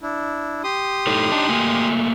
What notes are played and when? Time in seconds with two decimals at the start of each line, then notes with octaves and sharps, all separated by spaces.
0.01 D4 E4
0.64 G4 C6 D#6
1.07 A2 D#4 A4
1.32 D4 D#4 A5
1.49 A3 A#3 G#5